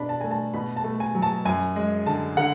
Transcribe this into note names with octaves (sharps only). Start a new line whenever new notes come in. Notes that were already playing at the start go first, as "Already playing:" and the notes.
Already playing: B2 D4 B5
A5
A3 G#5
A5
B2 B5
A5
A3
G#5
F#3
A5
F#2 G#5
G#3
D3 A5
D3 F#5